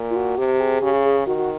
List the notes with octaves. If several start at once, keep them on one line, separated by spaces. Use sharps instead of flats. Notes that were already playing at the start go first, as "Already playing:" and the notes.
Already playing: A#2
F4
F#4
C3 G4
G#4
C#3 G4
G#4
G#4
D#3 F#4
F#4